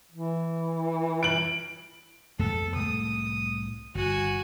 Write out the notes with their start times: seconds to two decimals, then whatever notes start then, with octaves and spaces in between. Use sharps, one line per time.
0.11 E3
1.23 D7 F#7
2.39 F2 G#3 B3 A4
2.75 C2 A2 D#6
3.95 G1 F#4 G#5